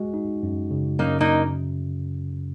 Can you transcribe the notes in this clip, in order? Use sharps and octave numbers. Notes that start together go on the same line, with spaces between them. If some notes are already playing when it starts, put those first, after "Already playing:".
Already playing: G#3 F#4
D#4
F#2
C#3
F#2 A#3 D#4
A#3 D#4